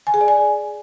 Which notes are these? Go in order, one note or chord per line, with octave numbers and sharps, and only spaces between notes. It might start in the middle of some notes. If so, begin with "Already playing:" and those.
G#5
G#4
D5
G#5